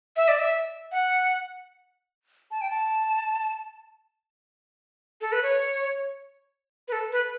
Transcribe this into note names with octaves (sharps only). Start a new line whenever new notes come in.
E5
D5
E5
F#5
A5
G5
A5
A4
B4
C#5
B4
A4
B4